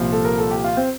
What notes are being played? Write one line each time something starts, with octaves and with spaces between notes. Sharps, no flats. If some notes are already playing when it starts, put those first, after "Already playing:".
Already playing: C2 A#2 F3
A4
A#4
A4
G4
F4
C4